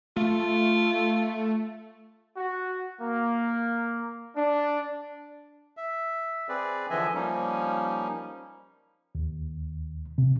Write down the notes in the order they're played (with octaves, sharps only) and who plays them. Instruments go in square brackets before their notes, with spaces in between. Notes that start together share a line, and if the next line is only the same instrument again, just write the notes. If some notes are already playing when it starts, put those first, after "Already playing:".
[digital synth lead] A3 [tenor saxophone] F4
[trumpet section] F#4
A#3
D4
[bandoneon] E5
C4 G#4 B4 D5
D3 E3 F3 D#5 E5 G#5
F3 G3 A#3 C#4 D#4
[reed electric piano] D#2
C3